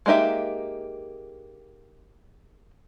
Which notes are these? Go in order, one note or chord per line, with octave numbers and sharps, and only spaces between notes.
G#3 A#3 D#4 G4 E5